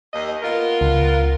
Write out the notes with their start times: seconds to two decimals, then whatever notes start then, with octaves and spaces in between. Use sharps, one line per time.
0.14 D#2 D#5
0.42 B3 F4 A#4
0.81 C#2